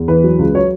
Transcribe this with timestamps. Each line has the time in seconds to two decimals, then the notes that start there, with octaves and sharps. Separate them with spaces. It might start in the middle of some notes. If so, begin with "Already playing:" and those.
Already playing: E2
0.08 E3 B4
0.24 F#3
0.39 C#2
0.54 F#3 C#5